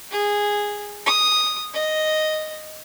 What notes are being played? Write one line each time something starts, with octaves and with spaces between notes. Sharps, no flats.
G#4
D#6
D#5